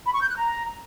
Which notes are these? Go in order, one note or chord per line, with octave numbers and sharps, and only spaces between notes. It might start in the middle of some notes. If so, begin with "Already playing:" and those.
B5
C#6
G6
F#6
A#5